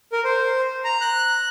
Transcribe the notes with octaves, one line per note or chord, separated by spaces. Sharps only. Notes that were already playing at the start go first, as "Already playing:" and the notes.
A#4
C5
A#5
F#6